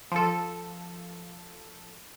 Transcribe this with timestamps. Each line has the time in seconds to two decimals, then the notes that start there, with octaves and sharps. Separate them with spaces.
0.12 F3 A4